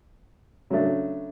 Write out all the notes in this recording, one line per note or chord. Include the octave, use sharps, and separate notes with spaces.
C#3 F#3 A3 D4